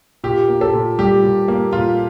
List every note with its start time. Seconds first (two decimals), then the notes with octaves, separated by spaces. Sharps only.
0.23 A#2 G4
0.48 A#3
0.61 A4
0.73 A#2
0.98 G3 G4
1.23 A#2
1.48 A#3
1.73 A#2 F4